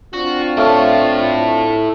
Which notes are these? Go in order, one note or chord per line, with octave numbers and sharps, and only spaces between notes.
C4 D4 F4 F#4
A3 E4 A4 C#5 F5